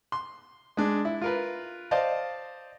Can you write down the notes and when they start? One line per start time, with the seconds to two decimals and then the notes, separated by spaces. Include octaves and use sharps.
0.12 C6
0.77 G#3 D4
1.05 E4
1.22 F4 A#4 B4
1.91 C5 D5 D#5 F5 A5